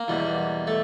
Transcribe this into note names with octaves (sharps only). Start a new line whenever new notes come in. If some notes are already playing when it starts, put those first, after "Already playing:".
Already playing: A#3 A#4
E2 B2 G3
A3 A4